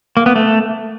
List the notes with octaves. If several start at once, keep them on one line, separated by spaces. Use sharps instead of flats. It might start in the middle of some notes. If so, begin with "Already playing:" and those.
A#3
B3
A3